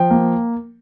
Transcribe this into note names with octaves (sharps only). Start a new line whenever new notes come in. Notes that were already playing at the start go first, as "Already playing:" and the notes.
Already playing: F3 G5
A#3